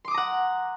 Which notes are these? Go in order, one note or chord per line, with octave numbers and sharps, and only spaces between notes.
F#5 A#5 C6 D6 D#6